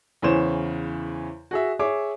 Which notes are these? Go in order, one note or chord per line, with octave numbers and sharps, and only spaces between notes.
E2 C#3 E3 C5 C#5 E7
F#4 G#4 E5
G#4 C#5 E5 D6